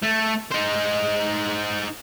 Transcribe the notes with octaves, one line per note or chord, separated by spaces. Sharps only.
A3
D#4 C5